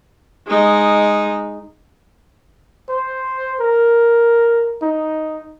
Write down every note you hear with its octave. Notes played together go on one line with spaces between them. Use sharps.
G#3 D#4
C5
A#4
D#4